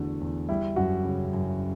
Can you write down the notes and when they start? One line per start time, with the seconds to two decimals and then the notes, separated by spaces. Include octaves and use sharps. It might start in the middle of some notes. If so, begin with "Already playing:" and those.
Already playing: E2 D3 A3 F#4
0.21 E2
0.49 G3 E4
0.76 F#2 F#4
1.04 C#3
1.33 F#2